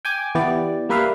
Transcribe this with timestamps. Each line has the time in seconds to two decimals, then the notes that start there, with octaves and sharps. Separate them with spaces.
0.05 G5 G#5 D6
0.35 E3 B3 G4 D5
0.89 G3 A#3 B4 E5 F5